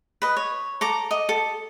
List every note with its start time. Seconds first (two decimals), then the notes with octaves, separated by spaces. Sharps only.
0.22 B4 D#5
0.37 C#5
0.81 A4 A#5 D6
1.11 D#5
1.29 A4